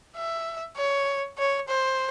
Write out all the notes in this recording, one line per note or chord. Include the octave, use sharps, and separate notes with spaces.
E5
C#5
C#5
C5